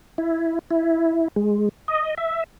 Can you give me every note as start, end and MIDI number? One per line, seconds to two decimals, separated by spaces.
0.18 0.59 64
0.71 1.28 64
1.36 1.69 56
1.88 2.15 75
2.18 2.44 76